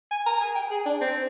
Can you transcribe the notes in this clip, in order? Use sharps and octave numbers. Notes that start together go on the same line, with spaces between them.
G#5
A#5
G#5
G5
G#4
D4
C4